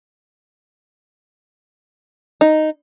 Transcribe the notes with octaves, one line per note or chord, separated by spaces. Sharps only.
D#4